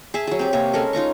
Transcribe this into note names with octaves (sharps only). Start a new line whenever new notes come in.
G#4 E5 A5
F#3 G#4
C4 G4
C3 A#3 C#5
G#3 C#4 A4 A#4
D#4 F4 A#5 C#6